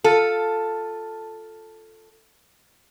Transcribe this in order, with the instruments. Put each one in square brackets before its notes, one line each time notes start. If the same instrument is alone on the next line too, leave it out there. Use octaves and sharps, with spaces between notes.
[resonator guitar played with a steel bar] F4 A4